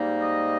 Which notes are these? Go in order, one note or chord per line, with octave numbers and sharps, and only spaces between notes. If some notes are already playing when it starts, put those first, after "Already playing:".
Already playing: G#2 G3 A#3 D#4
D#5